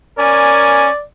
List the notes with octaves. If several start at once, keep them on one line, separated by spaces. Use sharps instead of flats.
C#4 A#4 D5 G#5